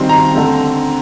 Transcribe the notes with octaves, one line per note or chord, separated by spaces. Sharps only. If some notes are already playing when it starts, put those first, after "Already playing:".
Already playing: D#3 G3 C4 C6
A#5
D3 A3 C4